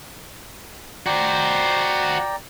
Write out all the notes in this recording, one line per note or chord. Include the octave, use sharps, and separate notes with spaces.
F#4 C5 D5 G5 A#5